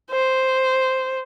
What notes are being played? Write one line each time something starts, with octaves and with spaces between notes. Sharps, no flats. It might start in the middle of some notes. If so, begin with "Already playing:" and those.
C5